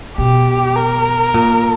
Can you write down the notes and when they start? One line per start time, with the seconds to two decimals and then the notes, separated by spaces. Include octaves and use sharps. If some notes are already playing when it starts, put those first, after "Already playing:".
0.18 B2 G4
0.76 A#4
1.34 A#2